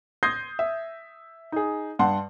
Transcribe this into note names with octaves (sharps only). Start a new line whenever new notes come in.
C6 D#6 G6 G#6 A#6 C7
E5
D#4 G#4
G2 F#5 A5 C6